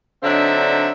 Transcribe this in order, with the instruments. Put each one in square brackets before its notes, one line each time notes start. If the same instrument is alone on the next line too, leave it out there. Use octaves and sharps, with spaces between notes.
[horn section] D3 F#3 C4 D4 D#4 E5